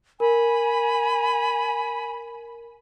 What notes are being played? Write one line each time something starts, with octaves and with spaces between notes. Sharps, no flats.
A#4 G#5 B5